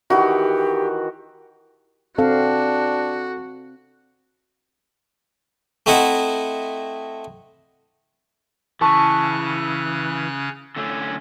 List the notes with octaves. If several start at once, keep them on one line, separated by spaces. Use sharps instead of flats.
D#3 E3 F#4 G4
C4 D4 F#4 A4 F5
A3 C4 E4 D#5 F#5
C#3 E3 C#4 A5 C#6 F#6 A6
D3 A3 C#4